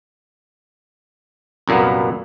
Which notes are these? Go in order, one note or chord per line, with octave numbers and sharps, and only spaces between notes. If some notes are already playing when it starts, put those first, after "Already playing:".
C2 F#2 A#2 A#3 B3